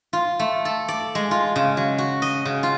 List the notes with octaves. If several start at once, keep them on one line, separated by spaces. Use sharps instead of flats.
F4
A3
A4
D5
G#3
F4
C#3
F#3
F#4
D#5
C#3
F4